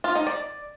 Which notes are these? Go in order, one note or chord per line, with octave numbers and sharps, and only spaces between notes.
F4
D#4
D5